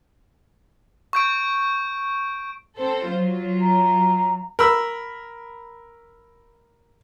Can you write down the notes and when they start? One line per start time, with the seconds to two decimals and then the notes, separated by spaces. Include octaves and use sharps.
1.13 C#6 G6 D7
2.77 C4 A4 C5
3.09 F#3 F4
3.61 A#5
4.59 A#4 B5 E6